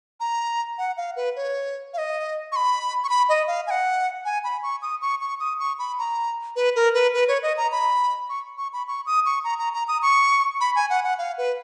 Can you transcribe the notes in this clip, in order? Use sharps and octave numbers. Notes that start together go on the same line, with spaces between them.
A#5
F#5
F5
B4
C#5
F5
D#5
C#6
B5
C#6
B5
D#5
F5
G#5
F#5
G#5
B5
C#6
D#6
C#6
C#6
D#6
C#6
B5
A#5
B4
A#4
B4
B4
C#5
D#5
A#5
B5
C#6
C#6
B5
C#6
D#6
C#6
A#5
A#5
A#5
D#6
C#6
B5
G#5
F#5
F#5
F5
B4